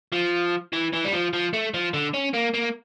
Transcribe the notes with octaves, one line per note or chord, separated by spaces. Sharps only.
F3
E3
E3
G3
F3
F3
A3
F3
D3
C#4
A#3
A#3